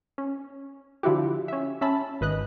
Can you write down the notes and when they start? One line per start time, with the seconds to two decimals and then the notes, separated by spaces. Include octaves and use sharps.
0.18 C#4
1.03 D3 F3 E4 F#4 G4
1.48 C#4 E5
1.81 C#4 E5 A5 B5
2.21 G#1 B4 D#5 F#6